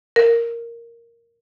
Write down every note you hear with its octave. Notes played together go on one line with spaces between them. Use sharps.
A#4